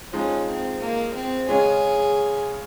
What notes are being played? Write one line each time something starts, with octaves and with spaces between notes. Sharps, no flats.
F3 G#3 C#4 D#4
C4
A#3
C4
C#3 G#3 C#4 G#4